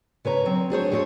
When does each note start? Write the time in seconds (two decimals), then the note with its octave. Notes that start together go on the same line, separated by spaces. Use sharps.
0.25 C#3 B4 C#5 A#5
0.46 F#3 C4
0.70 D4 G#4 C5 C#5
0.91 F2 G#3 C4 G4 A4 C#5